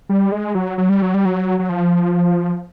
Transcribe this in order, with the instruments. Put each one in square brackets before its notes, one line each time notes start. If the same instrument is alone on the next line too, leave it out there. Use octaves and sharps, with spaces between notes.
[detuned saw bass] G3
G#3
F#3
F#3
G3
F#3
G3
F#3
F#3
F3